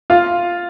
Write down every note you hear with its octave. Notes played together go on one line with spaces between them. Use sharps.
F4 F5